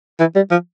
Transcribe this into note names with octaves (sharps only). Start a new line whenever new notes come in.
E3
G3
F3